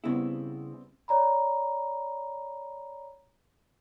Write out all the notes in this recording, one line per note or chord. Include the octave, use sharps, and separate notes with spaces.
C#3 G3 B3 C4 E4
C#5 D5 A#5 B5